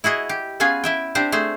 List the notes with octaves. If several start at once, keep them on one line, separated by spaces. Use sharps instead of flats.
E4 F#4 G#4 D#5
G4
B3 C#4 F4 G#4 G#5
E4 E5 G5
C4 D4 G4 C5
A3 G#4 C5